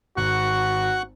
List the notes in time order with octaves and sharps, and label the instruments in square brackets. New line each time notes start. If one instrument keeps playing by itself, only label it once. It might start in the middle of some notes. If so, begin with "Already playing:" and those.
[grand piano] G#1 [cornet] F#4 [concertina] F#5 C#6 F#6